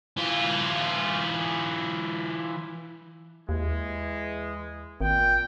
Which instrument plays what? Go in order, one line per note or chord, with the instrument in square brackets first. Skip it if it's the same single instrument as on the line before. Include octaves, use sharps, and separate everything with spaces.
[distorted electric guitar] E3 F4
[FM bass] D#2 [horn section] E3 G#3
[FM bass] G#1 [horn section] A#2 G5